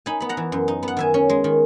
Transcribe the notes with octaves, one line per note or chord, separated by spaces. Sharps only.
D#4 G#5 B5
B3 B5
F#5 A#5
E3
F#2
D#4
B3
F#5
D#3 E5 G#5
C#4
G#3
D#3